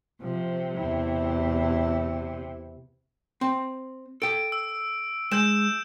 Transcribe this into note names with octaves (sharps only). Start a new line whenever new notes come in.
C3 F3
E2 E4
C4
A4 G5 D7
E6
G#3 E6 G6 E7